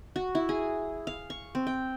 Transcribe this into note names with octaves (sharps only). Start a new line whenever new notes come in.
F#4
E4
G#4
F5
C#6
C4
G5